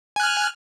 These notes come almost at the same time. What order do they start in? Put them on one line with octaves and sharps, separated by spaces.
G#5 F#6 F6